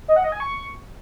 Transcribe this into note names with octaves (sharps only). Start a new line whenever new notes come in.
D#5
F#5
D#5
G#5
C#6